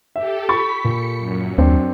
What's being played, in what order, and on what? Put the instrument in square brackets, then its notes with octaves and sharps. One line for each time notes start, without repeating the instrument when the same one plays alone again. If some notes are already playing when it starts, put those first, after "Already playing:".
[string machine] G4 A4 [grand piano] E5
[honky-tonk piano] B5 C#6 [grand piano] A6 [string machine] B6
[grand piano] A#2 [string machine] C#7
[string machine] F#2
[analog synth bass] D#2 [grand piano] C4 D4